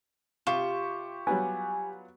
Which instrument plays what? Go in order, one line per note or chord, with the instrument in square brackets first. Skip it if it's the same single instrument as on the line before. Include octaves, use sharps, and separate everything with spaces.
[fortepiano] C3 [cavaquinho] F4 [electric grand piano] G4 C#6 E7
[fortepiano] F#3 G3 B3 [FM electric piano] G#5